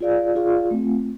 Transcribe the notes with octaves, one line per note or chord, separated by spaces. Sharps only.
F4 G#4 D5 F5
F4 G#4 D5 F5
A3 C4 F4